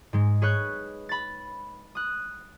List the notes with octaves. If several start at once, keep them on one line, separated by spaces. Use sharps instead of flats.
G#2 G#3
G#4 B4 C#5 F#6 G6
B5 A6
D#6 F#6